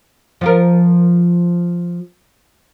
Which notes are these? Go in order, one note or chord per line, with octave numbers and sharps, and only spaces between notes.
F3 F4 A#4